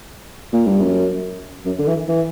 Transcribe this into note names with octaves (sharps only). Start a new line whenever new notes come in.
A#2
G2
F#2
F#2
D3
E3
E3